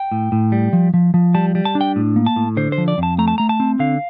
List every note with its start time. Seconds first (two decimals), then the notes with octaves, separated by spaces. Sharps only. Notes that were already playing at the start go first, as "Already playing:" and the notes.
Already playing: G5
0.12 A2
0.32 A2
0.52 G3
0.73 F3
0.94 F3
1.14 F3
1.34 G3 A5
1.55 G3
1.65 A5
1.75 D4
1.81 G5
1.96 A2
2.16 A#3
2.26 A5
2.36 A2
2.57 D3 C5
2.72 C5
2.78 F3
2.88 D5
2.98 F2 A5
3.18 A3 A#5
3.28 A5
3.38 A3 A#5
3.49 A5
3.60 C4
3.79 D3 F5